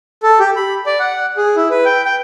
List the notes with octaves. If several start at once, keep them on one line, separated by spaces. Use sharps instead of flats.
A4
G4
B5
D5
F#5
G#4
E4
B4
G5
G5